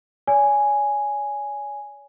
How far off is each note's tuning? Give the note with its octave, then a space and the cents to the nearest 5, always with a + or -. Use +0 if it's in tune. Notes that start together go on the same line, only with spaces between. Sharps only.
C#5 +45 G#5 +0